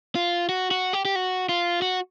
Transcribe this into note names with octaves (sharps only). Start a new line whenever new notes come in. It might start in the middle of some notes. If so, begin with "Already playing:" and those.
F4
F#4
F#4
G4
G4
F#4
F4
F#4